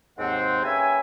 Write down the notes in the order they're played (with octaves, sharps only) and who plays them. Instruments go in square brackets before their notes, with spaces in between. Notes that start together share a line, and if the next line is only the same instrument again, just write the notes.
[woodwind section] D#2 G#2 C4 F#5
A#3 C#4 G4 B4 E5 G#5